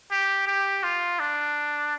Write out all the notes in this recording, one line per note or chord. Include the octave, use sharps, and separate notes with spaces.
G4
G4
F4
D4